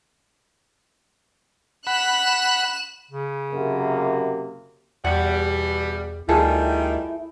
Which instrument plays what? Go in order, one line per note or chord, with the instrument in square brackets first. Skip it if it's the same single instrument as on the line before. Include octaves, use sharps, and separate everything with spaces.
[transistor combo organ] F#5 B5 [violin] F#6 E7
[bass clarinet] C#3
[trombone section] F#2 C3 A#3
[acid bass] E2 [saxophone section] B2 E3 G3 [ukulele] F#5
[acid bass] D2 [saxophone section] D#3 G3 [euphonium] E4 [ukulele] F4 G#4 A4